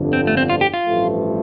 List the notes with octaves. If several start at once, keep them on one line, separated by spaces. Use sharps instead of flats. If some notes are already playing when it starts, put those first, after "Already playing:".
Already playing: G1 F2 D3
C4
A3
C4
F4
G4
F4
A1 G2 F3 A3